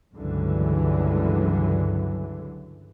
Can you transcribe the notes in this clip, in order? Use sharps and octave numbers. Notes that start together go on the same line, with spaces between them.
C#2 G2 D3 E3 F#3